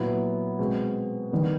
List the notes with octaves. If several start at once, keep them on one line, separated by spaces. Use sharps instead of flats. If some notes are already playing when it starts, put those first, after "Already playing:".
Already playing: A#2 F#3 B3 E4
B2 G#3 C4
D#3 G3 B3